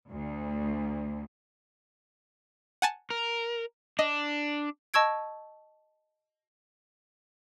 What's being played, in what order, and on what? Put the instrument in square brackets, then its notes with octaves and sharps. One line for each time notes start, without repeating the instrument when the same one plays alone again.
[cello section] D2
[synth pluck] F#5 G#5 A5
[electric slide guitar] A#4
[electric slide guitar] D4 [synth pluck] D#5
[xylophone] D#5 A5 C#6 E6 G#6 D7